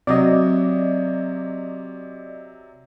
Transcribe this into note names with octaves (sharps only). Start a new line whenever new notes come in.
C3 F#3 D5 D#5